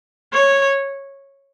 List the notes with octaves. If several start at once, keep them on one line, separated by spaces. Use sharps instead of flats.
C#5